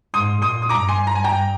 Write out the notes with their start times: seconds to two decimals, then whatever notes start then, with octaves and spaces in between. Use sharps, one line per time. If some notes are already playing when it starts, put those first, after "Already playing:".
0.14 G#2 C6 D#6
0.42 A#2 C6 D#6
0.62 D#6
0.69 G2 A#5 D6
0.89 G#5 C6
1.07 A#5
1.15 G#5
1.24 G5 A#5